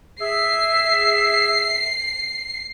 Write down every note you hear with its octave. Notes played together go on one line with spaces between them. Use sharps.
G#4 E5 C7